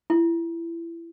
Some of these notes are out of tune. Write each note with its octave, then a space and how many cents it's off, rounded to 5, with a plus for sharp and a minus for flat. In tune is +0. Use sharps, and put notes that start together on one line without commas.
E4 +25